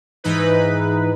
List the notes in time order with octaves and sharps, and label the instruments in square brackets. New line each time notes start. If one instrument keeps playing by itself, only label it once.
[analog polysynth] G#2 E3 D#4 B4